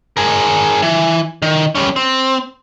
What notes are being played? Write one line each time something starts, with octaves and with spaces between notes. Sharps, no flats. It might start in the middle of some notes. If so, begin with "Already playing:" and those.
G#4 A#4
E3
D#3
G3 C#4
C4